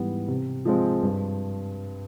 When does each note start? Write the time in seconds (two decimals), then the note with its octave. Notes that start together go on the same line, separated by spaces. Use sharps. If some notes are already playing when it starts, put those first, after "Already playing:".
Already playing: G#2 E3 G3 B3
0.28 C3
0.65 F3 G#3 C4
1.03 G2